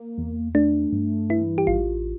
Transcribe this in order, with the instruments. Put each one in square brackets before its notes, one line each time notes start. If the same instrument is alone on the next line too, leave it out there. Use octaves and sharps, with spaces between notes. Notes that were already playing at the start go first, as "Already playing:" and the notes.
Already playing: [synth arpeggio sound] A#3
E2
[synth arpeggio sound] A3 [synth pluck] D4
[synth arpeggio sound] G2
[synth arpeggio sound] E3 [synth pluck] E4
[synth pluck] G4
[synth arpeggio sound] A1 [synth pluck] F4